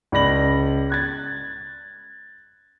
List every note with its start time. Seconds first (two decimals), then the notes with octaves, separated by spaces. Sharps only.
0.12 C#2 D5 B5 A#6 F#7
0.90 F#6 G#6 A6